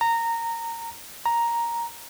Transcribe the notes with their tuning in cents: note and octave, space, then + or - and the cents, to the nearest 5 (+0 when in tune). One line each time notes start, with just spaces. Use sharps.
A#5 -15
A#5 +5